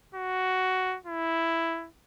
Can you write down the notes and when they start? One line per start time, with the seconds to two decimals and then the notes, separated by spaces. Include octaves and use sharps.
0.15 F#4
1.06 E4